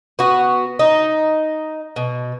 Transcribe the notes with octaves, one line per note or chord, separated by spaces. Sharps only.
B3 F#4
D#4
B2